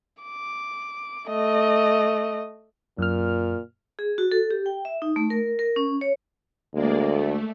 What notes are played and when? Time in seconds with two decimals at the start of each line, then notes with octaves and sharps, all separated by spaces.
0.23 D6
1.29 A3 D#5
2.98 F#2 A#2 F6
3.99 G#4
4.18 F#4
4.32 A4
4.51 G4
4.66 G5
4.85 E5
5.02 D#4
5.16 A3
5.30 A#4
5.59 A#4
5.76 C#4
6.01 C#5
6.74 D2 G#3 A#3 D5
7.09 A3